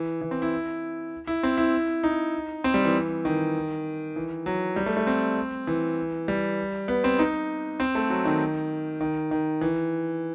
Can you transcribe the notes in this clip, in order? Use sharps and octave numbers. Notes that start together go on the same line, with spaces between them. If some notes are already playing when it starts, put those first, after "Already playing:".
Already playing: E3
E3
C4
E4
E4
C4
E4
D#4
C4
G3
E3
D#3
E3
F#3
G3
A3
A3
C4
E3
G3
B3
C4
D#4
C4
A3
F#3
D#3
D#3
D#3
E3